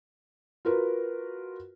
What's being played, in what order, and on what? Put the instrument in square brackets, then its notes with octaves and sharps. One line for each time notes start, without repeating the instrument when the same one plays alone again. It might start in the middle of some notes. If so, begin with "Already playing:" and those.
[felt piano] F4 F#4 A#4 B4